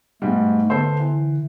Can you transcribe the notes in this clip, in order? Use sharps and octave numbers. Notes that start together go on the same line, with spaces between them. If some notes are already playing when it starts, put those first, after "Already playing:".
G#2 B2 G3 A3
D3 B3 A4 C5
E3